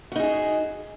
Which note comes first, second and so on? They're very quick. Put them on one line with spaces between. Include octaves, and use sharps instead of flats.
F#4 D#4 G#4